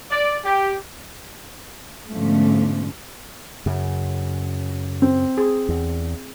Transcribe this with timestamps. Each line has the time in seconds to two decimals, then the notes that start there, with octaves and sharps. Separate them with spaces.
0.11 D5
0.44 G4
2.13 G#2 B2 D3 F3 A3 C#4
3.66 F#2 C#3
5.02 C4
5.38 G#4
5.69 E2